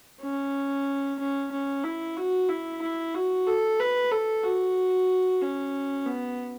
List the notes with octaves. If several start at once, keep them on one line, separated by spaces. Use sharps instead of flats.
C#4
C#4
C#4
E4
F#4
E4
E4
F#4
A4
B4
A4
F#4
C#4
B3